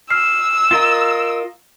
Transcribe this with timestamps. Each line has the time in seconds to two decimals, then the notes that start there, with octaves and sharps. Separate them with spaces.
0.10 E6 F6 C7
0.71 F4 A#4 D#5